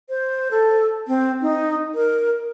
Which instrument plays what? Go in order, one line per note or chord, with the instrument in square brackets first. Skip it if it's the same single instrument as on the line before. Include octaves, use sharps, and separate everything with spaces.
[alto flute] C5
A4
C4
D#4
A#4